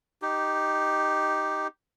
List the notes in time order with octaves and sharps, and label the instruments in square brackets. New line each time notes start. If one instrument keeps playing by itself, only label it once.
[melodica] D#4 G4